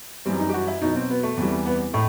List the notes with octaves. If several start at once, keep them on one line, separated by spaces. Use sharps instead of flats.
F#2 E3 G3 C4
D#4
G4
F#4
E4
B2 F#3 D#4
C4
B3
A3
E2 C3 E3 G3
B3
A2 A3